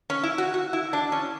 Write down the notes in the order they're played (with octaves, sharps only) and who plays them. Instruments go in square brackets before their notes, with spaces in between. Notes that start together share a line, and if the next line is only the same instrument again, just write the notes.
[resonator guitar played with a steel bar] C#4
E4
F#4
F#4
E4
D4
C#4